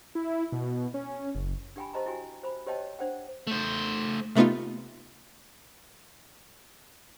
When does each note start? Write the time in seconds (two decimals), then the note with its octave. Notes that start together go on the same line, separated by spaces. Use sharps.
0.15 E4
0.52 B2
0.94 C#4
1.35 F#1
1.76 D4 G4 G5 G#5 B5
1.93 G4 C5 D#5 A5 A#5
2.06 E4 F#4 G4 G5 G#5
2.43 C5 B5
2.67 G4 C5 C#5 D#5 G5 A5
2.99 D4 C5 F#5 G5
3.47 A3 C5
4.35 C3 A3 B3 D#4 F4